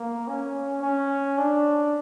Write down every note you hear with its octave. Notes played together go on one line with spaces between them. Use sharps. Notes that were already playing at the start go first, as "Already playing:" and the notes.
Already playing: A#3
C#4
C#4
D4